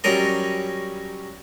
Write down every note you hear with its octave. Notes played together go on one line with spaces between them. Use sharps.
F#3 G3 C#4 A#4 D#5